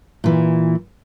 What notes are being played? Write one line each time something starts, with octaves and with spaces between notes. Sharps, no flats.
A#2 E3